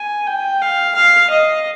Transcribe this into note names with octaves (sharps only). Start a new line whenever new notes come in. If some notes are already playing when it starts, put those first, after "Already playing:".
Already playing: G#5
G5
F5
F5
D#5